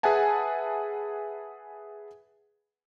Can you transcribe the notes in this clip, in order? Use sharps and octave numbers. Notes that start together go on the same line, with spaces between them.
G#4 B4 E5 F#5 G#5 A5